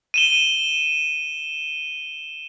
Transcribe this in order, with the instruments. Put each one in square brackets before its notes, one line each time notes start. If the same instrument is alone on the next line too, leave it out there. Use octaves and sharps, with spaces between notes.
[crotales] D#7 E7 G7